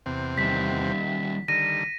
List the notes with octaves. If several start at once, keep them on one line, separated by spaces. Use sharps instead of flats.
E2 C3 C4
D#3 G3 B6
D3 D#3 G3 A#6 D#7